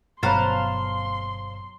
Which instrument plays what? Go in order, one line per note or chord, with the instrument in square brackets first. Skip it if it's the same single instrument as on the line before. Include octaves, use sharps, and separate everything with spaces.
[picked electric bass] G1 B2 [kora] F#3 B4 [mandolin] C5 F5 A5 [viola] C6